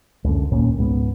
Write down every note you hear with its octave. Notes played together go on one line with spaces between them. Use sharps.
C#2 F#2 D3
G1 D#2 A#2 C#4
C#2 G#2 B3